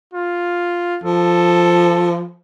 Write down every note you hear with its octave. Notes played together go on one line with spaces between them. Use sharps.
F4
F3 A4